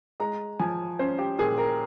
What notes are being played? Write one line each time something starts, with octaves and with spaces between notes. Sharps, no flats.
G#3 A#5
F3 G#5
C#4 C5
G4
A#2 G#4
A#4